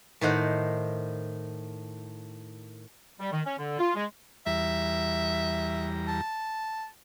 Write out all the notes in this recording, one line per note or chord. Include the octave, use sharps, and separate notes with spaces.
A2 D#3 C5 F#5
G3
D#3
C#4
D3
F4
G#3
E2 G3 E5 A#5
A5